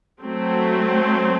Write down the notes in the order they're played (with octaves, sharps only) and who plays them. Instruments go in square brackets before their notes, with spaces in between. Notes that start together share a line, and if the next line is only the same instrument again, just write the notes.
[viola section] F#3 A3 C4